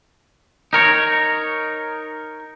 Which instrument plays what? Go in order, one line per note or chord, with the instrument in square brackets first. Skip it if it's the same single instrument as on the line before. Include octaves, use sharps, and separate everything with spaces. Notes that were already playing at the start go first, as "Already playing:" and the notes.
[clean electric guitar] D#4 A#4 C#5